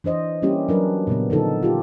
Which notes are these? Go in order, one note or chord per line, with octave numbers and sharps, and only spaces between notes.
E3 D4 C5 D#5
G3 A#3 C#4 E4 G4
F#3 D4 A#4 B4
A#2 C#3 B3
D3 F3 D#4 A4
F4 G4